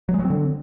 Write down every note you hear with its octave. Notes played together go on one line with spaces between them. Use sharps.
F#3
G#3
F#3
C4
D3